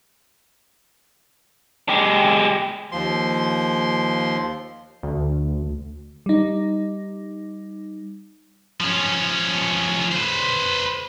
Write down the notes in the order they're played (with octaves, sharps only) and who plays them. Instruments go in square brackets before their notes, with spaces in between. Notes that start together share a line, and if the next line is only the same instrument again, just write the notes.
[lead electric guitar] G#3 G4
[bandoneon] D#2 F3 C6
[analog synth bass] D2
[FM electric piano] G3 D#4
[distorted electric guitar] F3 C#4
B4 C5